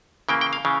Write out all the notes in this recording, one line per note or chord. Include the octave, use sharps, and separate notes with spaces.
C#3 E3 A#3 G5
G5
F5
C#3 E3